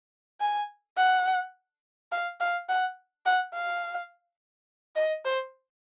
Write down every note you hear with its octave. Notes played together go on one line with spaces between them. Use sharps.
G#5
F#5
F5
F5
F#5
F#5
F5
D#5
C5